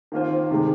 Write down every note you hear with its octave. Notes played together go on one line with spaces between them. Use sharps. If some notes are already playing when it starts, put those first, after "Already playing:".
D#3 A#3 F4 C5
C3 D#3 G#3